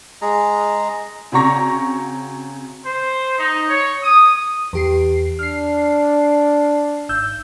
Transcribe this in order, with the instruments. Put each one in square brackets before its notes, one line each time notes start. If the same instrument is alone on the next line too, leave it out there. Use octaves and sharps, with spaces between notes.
[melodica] G#3 G#4 A#5
[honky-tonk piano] C#3 C4 F#4 A#5 C#6 A#6
[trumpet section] C5
D#4
C#5
D#6
[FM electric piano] E2 G4 C7
[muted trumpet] D4 [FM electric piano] F6 C7
[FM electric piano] G#1 E6 G6